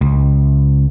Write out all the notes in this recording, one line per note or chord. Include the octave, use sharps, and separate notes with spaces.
C#2